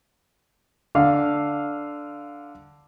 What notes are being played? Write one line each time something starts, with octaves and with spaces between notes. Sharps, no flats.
D3 F5